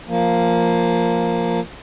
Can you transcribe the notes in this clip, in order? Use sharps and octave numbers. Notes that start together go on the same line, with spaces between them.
F3 A#3